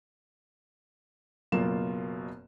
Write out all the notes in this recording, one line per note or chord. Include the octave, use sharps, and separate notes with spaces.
F#1 F#2 B2 A#3 F4 E7